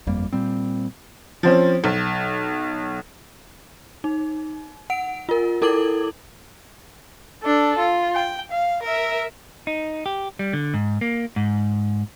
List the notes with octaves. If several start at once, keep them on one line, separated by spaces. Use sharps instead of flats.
G1 F2 G3 A#3
A#2 G3 C4
F3 C4 C#4
B1
D#4
F#5 D7
F4 A#4
E4 A4 A#4 D6 G#6 F#7
D4 A4
F4
G5
F5
A#4 E5
D#4
G4
G3
D3
G#2
A#3
G#2